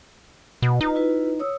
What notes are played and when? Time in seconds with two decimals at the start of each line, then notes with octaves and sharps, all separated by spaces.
0.62 B2
0.81 D#4 F4 B4
0.95 E4 F4 B4
1.40 C#5 D#6 E6